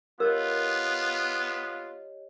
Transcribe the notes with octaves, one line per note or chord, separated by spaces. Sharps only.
B3 F4 G4 A#4 C#5 D#5